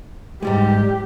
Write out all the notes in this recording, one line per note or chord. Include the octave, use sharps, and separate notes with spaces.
G#2 G3 G#3 G4